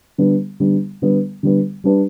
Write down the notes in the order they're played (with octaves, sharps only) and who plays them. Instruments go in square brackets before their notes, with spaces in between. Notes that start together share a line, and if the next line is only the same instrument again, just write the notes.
[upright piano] D3 G3 B3
D3 G3 B3
D3 G3 B3
D3 G3 B3
G3 D4 G4 B4